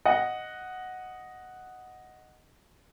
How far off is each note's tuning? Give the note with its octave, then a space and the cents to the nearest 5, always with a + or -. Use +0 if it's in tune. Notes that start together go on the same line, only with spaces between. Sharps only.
D#5 +0 F#5 +0